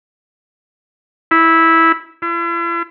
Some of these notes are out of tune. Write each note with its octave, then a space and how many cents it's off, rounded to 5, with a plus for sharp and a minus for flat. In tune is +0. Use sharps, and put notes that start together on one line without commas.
E4 -10
E4 +45